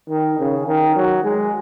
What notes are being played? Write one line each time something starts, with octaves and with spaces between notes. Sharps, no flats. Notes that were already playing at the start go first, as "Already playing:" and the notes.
D#3
C#3
D#3
F#3
G#3